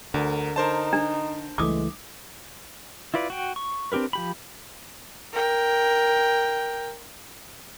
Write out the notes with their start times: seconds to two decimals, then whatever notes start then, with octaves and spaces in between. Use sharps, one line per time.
0.14 D2 D3 A#4
0.56 D#4 A#4 C5 A5
0.93 D4
1.58 C#2 E3 G#3 A3 D6 D#6
3.14 E4 F4 B4 D5
3.30 F#4 G5
3.56 C#6
3.92 C4 D4 G4 A#4 B4
4.13 F3 G4 B5
5.33 A#4 G5